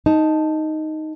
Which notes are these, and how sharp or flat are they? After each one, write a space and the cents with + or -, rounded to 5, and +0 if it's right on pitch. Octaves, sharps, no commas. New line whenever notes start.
D#4 +0 A5 +0